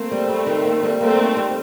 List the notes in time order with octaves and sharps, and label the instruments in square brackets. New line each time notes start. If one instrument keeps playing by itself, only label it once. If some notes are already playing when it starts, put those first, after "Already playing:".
Already playing: [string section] A3 C4 [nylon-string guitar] A#3
[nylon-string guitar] G3
G3
D#3
A#3
G3
[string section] A3 C4 [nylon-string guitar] A#3
[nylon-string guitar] D#4
G3